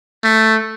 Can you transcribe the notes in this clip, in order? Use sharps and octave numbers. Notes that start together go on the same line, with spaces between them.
A3